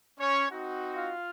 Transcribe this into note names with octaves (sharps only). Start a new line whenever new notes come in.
C#4 C#5
C4 D#4 F#4
F4 F5